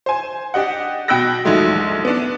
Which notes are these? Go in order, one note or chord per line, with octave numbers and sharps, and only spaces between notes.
C5 G#5
D4 G4 D#5 F#5
B2 G5 B5 E6 F#6 A#6
A#1 D#2 G#2 F#3 G#3 A3
B3 D4